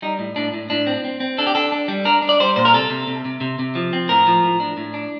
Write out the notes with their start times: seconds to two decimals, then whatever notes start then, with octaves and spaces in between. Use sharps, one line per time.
0.02 G3 D#4
0.19 A2
0.36 A2 D4
0.54 A2
0.70 A2 D4
0.87 C4
1.05 C4
1.20 C4
1.38 D4 A4
1.47 G4
1.55 D4 A4
1.72 D4
1.88 G3
2.05 D4 A#4
2.22 D4
2.29 D5
2.40 G3 C5
2.56 A#2 C5
2.65 A#4
2.74 C3 A4
2.90 C3
3.07 C3
3.25 C3
3.41 C3
3.59 C3
3.75 F3
3.93 C4
4.09 A2 A#4
4.27 F3
4.44 A2
4.60 D4
4.77 A2
4.94 D4